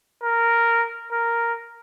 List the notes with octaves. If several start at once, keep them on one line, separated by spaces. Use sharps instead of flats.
A#4
A#4